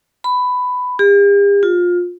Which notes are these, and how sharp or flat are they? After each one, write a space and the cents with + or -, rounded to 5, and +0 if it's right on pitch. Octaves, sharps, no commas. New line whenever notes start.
B5 +15
G4 +45
F4 +20